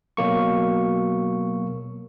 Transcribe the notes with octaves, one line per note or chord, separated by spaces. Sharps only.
B2 F#3 A#3 C#6